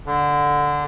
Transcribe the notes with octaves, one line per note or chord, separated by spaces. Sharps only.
D3